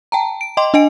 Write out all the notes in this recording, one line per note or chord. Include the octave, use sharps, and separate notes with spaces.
G5 A5 A#5
D7
D#5 G5 C6 D6
D4 D#5 G#5 D7